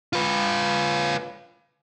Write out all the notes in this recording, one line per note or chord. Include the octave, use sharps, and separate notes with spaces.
F4 B4